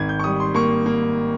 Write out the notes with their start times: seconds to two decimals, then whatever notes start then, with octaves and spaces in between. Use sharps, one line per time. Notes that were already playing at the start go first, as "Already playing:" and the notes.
Already playing: G#1 G#6
0.09 G6
0.19 C#6
0.24 G3 D#6
0.40 C6
0.54 A#3 C#6
0.86 A#3